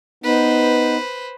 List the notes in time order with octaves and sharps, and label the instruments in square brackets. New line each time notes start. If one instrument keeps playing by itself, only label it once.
[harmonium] B3 D#4 [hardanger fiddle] B4 C5